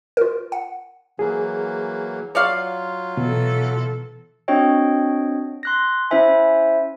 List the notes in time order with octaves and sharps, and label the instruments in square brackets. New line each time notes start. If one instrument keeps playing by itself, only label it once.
[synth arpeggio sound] F4 A#4
F#5
[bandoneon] E3 F#3 A#3 [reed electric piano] G#4
[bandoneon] F#3 F4 [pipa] C#5 D5 F5
[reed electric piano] B2 [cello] E3 A4
[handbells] C4 D4 F#4 C#5 D#5 G5
C6 F#6 A#6
C#4 E4 C5 E5 G#5